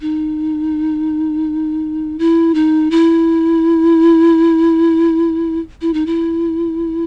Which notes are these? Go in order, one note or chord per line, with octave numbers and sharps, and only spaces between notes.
D#4
E4
D#4
E4
E4
D#4
E4